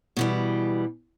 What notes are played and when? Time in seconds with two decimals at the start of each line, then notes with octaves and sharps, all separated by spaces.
0.17 B2 E3 G3